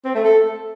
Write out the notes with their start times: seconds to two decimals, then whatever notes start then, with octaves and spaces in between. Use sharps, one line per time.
0.05 C4
0.15 A3
0.25 A4